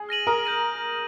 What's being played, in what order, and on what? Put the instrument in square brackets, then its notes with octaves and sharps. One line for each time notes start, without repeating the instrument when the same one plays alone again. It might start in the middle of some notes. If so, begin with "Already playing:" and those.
Already playing: [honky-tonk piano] G#4
[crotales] F6 A#6 D#7 F#7
[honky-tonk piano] A#4 [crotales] D#6
[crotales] G6 A#6 D#7